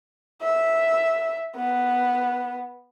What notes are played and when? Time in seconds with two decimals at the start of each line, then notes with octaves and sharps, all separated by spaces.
0.43 E5
1.56 B3